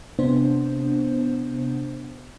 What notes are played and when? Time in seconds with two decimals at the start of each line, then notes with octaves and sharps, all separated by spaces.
0.19 C3 B3 D4 C5